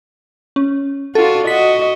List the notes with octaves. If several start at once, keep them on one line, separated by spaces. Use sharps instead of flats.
C#4
D4 F4 F#4 A4
F#4 D#5 B6